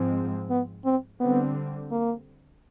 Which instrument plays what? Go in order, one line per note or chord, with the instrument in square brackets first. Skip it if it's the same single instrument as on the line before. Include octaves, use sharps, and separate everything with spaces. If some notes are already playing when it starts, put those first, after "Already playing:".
Already playing: [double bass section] G#2 F3 G#3 C4
[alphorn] B3
C4
[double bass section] D3 G3 C4 [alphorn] B3
[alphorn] A#3